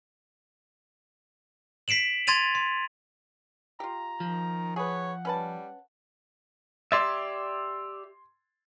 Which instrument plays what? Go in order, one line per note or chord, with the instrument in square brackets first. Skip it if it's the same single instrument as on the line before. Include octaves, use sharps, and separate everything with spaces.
[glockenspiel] B6 C7 D7 E7 F#7
C6 G#6 A6 D#7 F7
C6
[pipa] F4 G4 [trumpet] A#5
[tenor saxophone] D#3 [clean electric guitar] F3
[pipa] G#4 B4 [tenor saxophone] C#5 [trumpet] F#5
[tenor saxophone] G3 [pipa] C#4 B4 A5
[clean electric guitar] G4 D5 E5 [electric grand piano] C6 G#6 A6